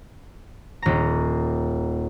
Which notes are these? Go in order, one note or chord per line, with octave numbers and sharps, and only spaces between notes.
D#1 A#5